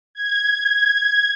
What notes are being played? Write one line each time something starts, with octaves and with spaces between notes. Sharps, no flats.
G#6